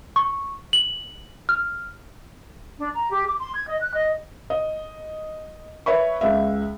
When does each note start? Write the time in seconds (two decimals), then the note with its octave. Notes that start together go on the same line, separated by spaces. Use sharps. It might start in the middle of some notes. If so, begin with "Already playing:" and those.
0.16 C#6
0.73 F#7
1.49 F6
2.77 D4
2.94 A#5
3.11 G4
3.26 D6
3.39 C6
3.54 G#6
3.67 D#5
3.81 F#6
3.94 D#5
4.50 D#5
5.86 B4 C#5 E5 B5 C#6
6.21 C#2 E5